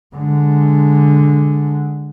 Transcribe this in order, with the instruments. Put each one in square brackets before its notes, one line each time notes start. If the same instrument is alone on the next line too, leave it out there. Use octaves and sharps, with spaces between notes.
[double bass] D3 G#3